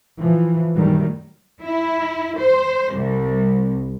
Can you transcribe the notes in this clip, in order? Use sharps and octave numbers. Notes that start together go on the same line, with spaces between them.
E3 F3
F#2 A#2 D#3 F#3 G3 A3
E4
C5
C2